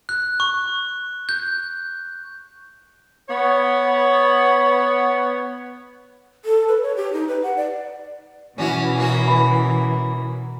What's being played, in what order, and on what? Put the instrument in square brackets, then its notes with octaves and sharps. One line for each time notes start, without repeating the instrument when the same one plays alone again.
[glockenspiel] F#6
C#6
G6
[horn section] B3 C#5
[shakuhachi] A4
B4
C#5
G4
D#4
B4
F#5
D5
[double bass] B2 [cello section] E3 [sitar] C#4 D4 F#4
[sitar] A#3 C#4 F#4
[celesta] B5